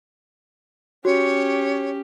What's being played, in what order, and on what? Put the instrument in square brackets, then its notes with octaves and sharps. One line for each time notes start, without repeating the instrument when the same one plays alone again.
[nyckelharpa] C#4 G4 [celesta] F#4 [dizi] C#5